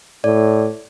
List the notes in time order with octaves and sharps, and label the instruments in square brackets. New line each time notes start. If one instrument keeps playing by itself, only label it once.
[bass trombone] A2 [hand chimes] D5